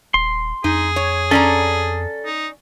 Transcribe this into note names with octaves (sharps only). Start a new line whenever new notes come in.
D#1 C6
F2 D#4 G#4
C#5
C#4 A4 D5 A#5
D#4